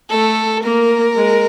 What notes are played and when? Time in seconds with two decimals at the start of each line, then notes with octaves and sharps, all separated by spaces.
0.10 A3 A4
0.64 A#3 A#4
1.15 G#3